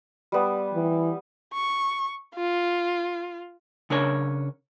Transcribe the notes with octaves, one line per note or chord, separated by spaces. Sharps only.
G3 B3
E3
C#6
F4
C#3 D4 A#4 C#5